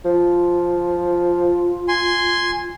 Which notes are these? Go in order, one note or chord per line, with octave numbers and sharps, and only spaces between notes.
F3 F4
G#5 C6